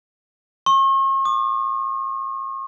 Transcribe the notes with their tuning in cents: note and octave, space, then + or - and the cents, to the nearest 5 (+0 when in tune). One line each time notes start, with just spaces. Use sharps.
C#6 -40
D6 +30